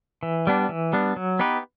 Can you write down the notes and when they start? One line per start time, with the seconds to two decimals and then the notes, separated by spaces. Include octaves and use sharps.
0.23 E3
0.47 G3 B3 D4
0.69 E3
0.93 G3 B3 D4
1.16 F#3
1.39 B3 D#4 G4 B4